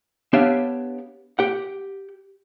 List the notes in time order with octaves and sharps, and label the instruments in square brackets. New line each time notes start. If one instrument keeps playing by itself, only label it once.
[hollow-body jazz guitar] B3 D4 G4 C#5 E5 F5
G4 F#5